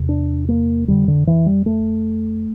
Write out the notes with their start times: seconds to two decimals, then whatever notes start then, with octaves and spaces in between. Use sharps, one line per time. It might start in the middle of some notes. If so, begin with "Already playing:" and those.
Already playing: E2 C3
0.09 D4
0.49 A#3
0.88 F2 D3 G3
1.08 D3
1.27 E3
1.46 G3
1.66 A3